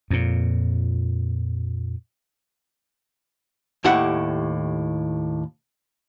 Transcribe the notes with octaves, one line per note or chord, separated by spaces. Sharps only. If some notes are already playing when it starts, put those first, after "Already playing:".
F2 A#2
D#2 A2 E4 G4 F#5 B5